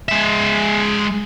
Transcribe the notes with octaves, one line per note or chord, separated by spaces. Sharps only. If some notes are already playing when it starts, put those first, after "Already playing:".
G#3 E5